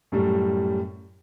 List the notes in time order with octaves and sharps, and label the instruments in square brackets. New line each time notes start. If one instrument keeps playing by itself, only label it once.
[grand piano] F#2 A2 G3